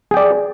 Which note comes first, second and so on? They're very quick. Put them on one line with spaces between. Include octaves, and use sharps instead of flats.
G#4 G5 D5